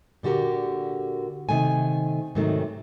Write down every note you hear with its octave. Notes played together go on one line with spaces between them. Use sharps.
A#2 D3 F#4 G4 A#4
C3 D#3 A3 G#5
G#2 C3 D#3 F#3 A3